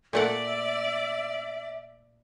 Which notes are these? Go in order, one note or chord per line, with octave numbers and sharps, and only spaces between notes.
A#2 A3 D5 E5 F#5